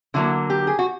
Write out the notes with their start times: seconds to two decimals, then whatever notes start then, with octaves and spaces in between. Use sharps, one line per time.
0.14 D3 F#3 A#3 E4
0.50 G4
0.67 G#4
0.79 F#4